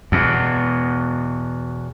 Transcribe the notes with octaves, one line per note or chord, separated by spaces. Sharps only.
E2 B2